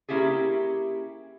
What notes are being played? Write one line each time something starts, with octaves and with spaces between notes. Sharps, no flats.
A#3 C#4 E4 G4 G#4